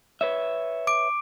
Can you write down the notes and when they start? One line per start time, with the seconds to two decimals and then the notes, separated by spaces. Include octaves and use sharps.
0.21 B4 C#5 E5
0.87 D6 D7